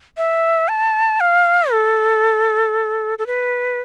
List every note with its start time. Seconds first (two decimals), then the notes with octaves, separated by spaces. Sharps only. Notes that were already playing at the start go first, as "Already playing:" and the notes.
0.17 E5
0.68 A5
1.20 F5
1.72 A4
3.19 A4
3.27 B4